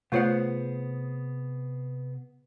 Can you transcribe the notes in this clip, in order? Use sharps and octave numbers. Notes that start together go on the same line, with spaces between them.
C3 A3 B3 F4 G#4 C5 C#5 F#5